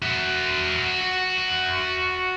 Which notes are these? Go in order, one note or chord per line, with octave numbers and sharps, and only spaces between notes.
F#4 E5